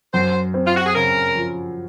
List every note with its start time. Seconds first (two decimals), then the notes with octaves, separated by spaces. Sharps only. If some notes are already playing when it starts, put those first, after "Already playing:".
0.14 F#2 C5
0.54 C4
0.67 F4
0.76 F#4
0.86 G#4
0.95 C#3 A#4
1.36 F3